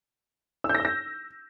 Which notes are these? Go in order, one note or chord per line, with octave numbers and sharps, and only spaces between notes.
E6
G6
A#6
E6
A#6